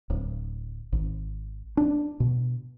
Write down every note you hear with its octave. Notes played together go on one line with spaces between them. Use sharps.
D1
G#1
D4
B2